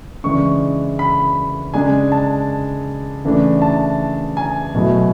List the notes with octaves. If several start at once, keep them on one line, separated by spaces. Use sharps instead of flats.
C#3 E3 G#3 D4 C#6
B5
C#3 G#3 D4 G#5
A5
C#3 E3 A3 D4
A5
G#5
B2 F#3 A3 E4